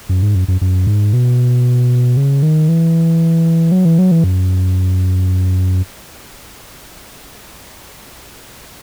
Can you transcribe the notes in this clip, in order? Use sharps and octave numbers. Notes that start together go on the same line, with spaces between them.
F#2
G#2
F#2
F#2
F#2
G#2
B2
C#3
D#3
E3
F#3
E3
F#3
E3
F#2